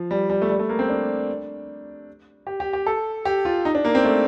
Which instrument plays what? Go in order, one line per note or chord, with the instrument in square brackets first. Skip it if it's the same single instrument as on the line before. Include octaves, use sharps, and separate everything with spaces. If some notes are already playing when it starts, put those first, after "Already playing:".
Already playing: [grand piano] F3
G3
G3
A3
G3
A3
A#3
C4
D4
G4
G4
G4
A4
G4
F4
D#4
D4
A#3
C4
A3